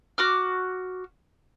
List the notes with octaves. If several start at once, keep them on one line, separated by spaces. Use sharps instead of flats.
F#4 D6 F6